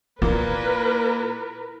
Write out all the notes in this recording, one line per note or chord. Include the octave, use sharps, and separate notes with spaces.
A#2 A#3 E4 A#4 B4